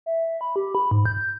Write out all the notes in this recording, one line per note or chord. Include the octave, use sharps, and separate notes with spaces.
E5
B5
G4
B5
G#2
G6